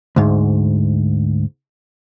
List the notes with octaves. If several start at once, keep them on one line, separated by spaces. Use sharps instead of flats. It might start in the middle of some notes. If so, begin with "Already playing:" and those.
D2 G#2